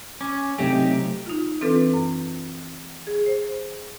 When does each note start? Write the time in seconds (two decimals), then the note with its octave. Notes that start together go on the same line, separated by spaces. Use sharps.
0.21 C#4 D6
0.58 C3 F#3 A3 C4 D#4 G4
1.26 D#4 F4
1.61 E3 C4 D4 F4 A4 B4
1.94 F#2
3.07 G#4
3.26 C5